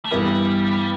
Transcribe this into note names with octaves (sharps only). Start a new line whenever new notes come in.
A3
G2 E3 G3 B3 E4 B4